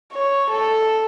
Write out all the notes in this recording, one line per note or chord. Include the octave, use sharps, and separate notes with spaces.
C#5
A4